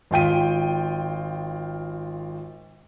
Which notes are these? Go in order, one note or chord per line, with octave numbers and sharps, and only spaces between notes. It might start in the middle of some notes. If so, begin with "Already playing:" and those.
G#1 F4 G5 D#7